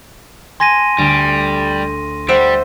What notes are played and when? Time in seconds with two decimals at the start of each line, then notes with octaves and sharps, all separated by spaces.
0.60 G#5 A5 C6 A#6 D#7
0.99 D2 G3
2.29 G3 C5 E5 F#5